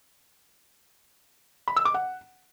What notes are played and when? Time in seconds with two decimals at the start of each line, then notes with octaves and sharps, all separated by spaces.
1.68 B5
1.76 E6
1.85 D6
1.94 F#5